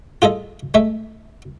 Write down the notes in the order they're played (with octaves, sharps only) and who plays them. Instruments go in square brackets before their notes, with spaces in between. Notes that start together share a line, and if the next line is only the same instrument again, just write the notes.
[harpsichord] F4 G#4 A4 D#5
G#3 A3 E5